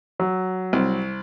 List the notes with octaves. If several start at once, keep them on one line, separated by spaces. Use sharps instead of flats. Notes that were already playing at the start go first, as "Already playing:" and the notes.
F#3
C2